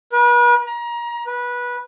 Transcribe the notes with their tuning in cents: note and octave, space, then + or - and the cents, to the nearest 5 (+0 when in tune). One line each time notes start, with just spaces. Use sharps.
B4 -40
A#5 +30
B4 -20